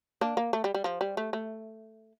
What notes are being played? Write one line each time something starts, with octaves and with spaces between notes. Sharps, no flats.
A#3 D4
A#3
A3
G3
G3
F3
G3
A3
A3